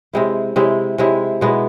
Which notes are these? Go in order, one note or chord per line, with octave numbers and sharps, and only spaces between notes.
C3 G#3 C4 E4
C3 G#3 C4 E4
C3 G#3 C4 E4
B2 G#3 B3 E4